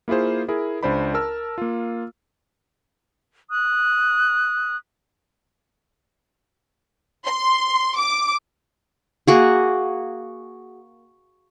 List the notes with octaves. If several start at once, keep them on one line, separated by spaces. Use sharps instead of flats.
A#3 E4 F4 G#4 C5
E4 G#4 A#4
C#2 D4 C5 D5 B5
A#4 A5 E6 F6
A#3 F4
D#6 F#6
C6
D6
A#3 F#4 G#4